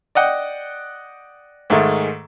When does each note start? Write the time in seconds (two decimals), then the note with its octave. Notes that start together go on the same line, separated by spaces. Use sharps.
0.15 D5 D#5 F#5 G5
1.70 G#2 D#3 G#3 A3